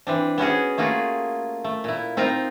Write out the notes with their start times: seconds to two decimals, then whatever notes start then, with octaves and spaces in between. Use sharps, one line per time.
0.07 E3 C4 D4
0.38 B3 C#4 F#4 G#4
0.78 A3 A#3 F4 F#4 G#4
1.64 A3
1.84 A#2 E4
2.17 C4 D#4 F4 A#4 F5 A#5